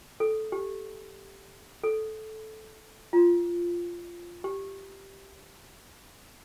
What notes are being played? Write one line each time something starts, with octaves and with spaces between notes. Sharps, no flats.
A4
G4
A4
F4
G4